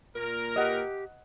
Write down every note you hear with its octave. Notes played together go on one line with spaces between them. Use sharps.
A#2 A#4
G4 D#5 F#5